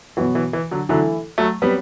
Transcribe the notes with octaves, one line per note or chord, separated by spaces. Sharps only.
B2 E3 F#3 B3 F#4
E3
E3
D3 F#3
D3 E3 F#3 A3 E4 A4
F#3 A3
F#3 G3 B3 C4